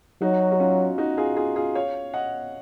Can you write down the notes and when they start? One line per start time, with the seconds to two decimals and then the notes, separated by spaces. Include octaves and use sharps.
0.21 F#3 D#4 F#4
0.52 F#4
0.60 C#4 F4
0.98 D#4 F#4
1.18 F4 G#4
1.37 F4 G#4
1.56 F4 G#4
1.75 C#5 F5
2.14 D#5 F#5